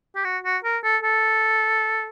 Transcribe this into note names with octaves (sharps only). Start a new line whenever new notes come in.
G4
F#4
F#4
A#4
A4
A4